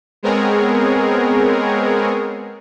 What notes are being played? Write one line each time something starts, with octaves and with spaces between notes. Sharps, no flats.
G#3 B3 C4 G#4 A#4 C#5